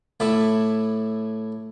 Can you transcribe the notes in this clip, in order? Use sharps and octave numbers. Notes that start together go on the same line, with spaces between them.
A2 A3 E4 A5 D6